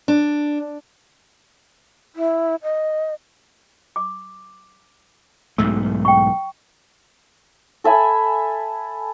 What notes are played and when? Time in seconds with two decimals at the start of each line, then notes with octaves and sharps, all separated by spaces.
0.08 D4
2.15 E4
2.63 D#5
3.96 D6
5.58 B1 G#2 A3 E6
6.05 G5 C#6
7.84 A4 E5 G#5 B5